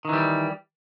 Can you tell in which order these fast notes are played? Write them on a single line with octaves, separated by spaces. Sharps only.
D#3 E3 G3